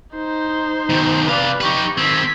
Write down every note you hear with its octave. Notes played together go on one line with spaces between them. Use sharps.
D#4 C5
B2 D#3
C3 B4 D5 F5
D#4 G4 B4 C#6
D#3 C4 G#6 B6